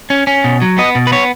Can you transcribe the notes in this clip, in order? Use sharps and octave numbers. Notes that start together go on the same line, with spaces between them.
C#4
C#4
B2
F#3
B3 D#5
B2
B4
B3 C#5